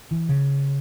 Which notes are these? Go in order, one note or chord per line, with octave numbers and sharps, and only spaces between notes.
E3
C#3